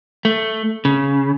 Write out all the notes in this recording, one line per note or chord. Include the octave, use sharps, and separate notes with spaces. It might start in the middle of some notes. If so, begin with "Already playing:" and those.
A3
C#3